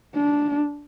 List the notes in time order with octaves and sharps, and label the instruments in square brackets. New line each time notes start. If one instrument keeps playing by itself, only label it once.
[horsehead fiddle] D4